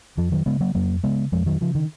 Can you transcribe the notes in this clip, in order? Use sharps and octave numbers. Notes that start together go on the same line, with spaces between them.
F2 F3
D#3 F#3
C#3 G#3 B3
F#3 A#3
F2 F#3 A#3
C#3 G#3 B3
F2 F3 G#3
D#3 F#3
C#3 F3
D#3